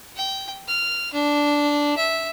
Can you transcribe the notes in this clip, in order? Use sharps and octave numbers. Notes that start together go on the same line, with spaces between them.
G5
F6
D4
E5